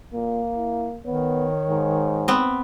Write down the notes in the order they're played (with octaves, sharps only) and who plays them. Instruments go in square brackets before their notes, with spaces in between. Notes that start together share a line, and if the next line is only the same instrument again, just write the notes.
[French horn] A#2 [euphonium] A#3
[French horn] E4
[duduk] D#3 [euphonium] B3 [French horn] C#5
[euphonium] G#2
[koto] B3 C4